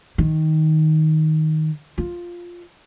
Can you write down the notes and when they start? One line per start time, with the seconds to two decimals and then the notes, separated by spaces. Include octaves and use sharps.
0.18 D#3
1.98 F4